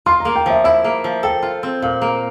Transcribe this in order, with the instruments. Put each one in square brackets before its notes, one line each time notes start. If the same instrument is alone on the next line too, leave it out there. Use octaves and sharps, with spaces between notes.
[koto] F4 [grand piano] C6
[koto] A#3 [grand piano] A#5
[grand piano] G5
[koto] F3 [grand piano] E5
[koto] E4 [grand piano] E5
[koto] A#3
F3
[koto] A4 [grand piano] G5
[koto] F4
C4
[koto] A#2 [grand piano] F5
[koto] A#3